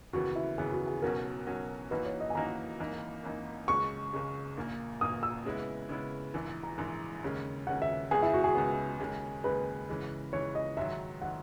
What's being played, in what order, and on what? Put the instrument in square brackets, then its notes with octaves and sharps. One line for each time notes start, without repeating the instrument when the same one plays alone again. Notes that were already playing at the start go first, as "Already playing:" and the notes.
[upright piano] D#2 C#3 E3 B3 [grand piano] F#4
[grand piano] E4
[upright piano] D#2 C#3 E3 B3 [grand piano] G#4
[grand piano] F#4
G#4
[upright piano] B1 B2 F#3 C#4 F#4 [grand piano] A#4
[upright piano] B1 B2 F#3 C#4 F#4
[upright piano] F#2 E3 A#3 D#4 F#4 [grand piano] B4
[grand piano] C#5
D#5
G#5
[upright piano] F#2 E3 A#3 D#4 F#4 [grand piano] A#5
[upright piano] G#1 F#2 E3 A#3 D#4
G#1 F#2 E3 A#3 D#4
[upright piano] C#2 C#3 G#3 [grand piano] C#6
[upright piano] C#2 C#3 G#3
A#1 A#2 A#3
[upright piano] A#1 A#2 A#3 [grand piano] D#6
[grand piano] E6
[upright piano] C#3 G#3 B3 E4
C#3 G#3 B3 E4
A#1 G#2 E3
[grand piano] A#5
[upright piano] A#1 G#2 E3
D#2 C#3 G#3 C#4
[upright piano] D#2 C#3 G#3 C#4 [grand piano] F#5
[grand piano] E5
[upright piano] C#2 C#3 G#3 B3 [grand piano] G#4
[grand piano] E4
F#4
G#4
[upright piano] C#2 C#3 G#3 B3
D#2 C#3 G#3
[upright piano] D#2 C#3 G#3 [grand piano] B4
[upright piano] C#3 E3 G#3
[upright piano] C#3 E3 G#3 [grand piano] C#5
[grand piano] D#5
[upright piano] G#2 D#3 F#3 [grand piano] E5
[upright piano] D#3 F#3 [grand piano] F#5